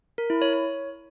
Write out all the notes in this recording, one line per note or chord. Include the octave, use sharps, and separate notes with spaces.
A#4
E4
C#5
C#5